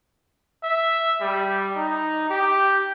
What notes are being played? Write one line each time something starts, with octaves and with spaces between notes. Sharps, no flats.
E5
G3
D#4
G4